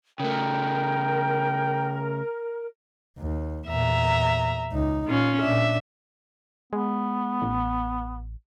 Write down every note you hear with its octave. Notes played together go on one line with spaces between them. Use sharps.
C#3 A3 A#4 G5
D#2
E2 A#2 E5 A#5
C#2 D#4
A#2 C#4 F4
A#2 D4 E5
G#3 B3
A1